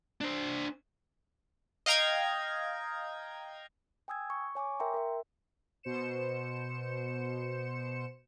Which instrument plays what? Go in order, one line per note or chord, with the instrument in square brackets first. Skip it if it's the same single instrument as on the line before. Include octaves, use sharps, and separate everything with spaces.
[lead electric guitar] D4 C5
[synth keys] D#5 F5 G5 A#5 G#6
[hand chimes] G5 G#5 D#6 E6 G#6
C#6
C#5 G#5 C#6 D6
A#4 E5 G5 A#5 C6
A#4 E5
[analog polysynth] B2 C5 C#7 E7